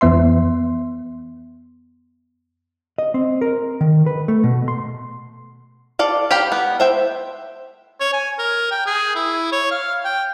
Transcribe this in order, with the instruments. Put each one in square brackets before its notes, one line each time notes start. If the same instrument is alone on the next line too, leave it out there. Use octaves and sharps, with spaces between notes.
[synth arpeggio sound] F2 E3 B3 E5 C6
[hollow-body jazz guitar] D#5
C4
A#4
D#3
B4
A3
B2
C6
[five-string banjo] A4 D5 F5
G4 F5 G5 B5
B3
C5 E5 G5
[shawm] C#5
G#5
A#4
G5
G#4
E4
C#5
F5
G5